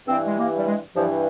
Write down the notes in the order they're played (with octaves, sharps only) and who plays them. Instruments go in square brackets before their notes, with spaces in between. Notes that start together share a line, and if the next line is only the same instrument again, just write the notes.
[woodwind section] G2 E3 C4
G#3
A#3
G3
G#3
G2 E3 F3